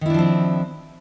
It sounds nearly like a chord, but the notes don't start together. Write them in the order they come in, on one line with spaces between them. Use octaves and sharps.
D#3 E4 D4 F3 C4